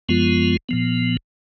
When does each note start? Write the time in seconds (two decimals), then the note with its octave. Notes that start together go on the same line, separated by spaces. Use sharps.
0.09 F#2 F3 G#3 B3 F4
0.69 A#2 F3 B3